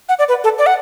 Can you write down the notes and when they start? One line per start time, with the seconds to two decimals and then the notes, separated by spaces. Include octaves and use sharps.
0.09 F#5
0.19 D5
0.28 B4
0.44 A4
0.58 D5
0.66 F#5